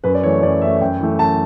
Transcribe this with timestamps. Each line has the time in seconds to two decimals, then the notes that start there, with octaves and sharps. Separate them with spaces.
0.04 F#2 B4
0.15 D5
0.23 E3 A3 C#5
0.42 F#2 D5
0.61 E3 E5
0.67 A3
0.81 F#2 G5
1.00 E3 A3
1.19 F#2 A5